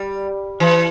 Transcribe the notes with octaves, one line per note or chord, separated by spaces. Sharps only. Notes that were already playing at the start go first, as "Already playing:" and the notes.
Already playing: G3
E3